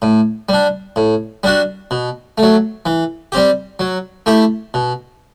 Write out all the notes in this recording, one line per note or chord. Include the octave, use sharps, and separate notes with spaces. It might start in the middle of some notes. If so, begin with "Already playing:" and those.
A2
G3 D4
A2
G3 D4 F#4
B2
A3
F#3
E3
G3 C4 G4
F#3
A3 E4 G4
B2